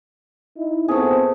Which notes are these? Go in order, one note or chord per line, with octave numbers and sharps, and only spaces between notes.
D#4 E4
A#2 A3 B3 C4 G#4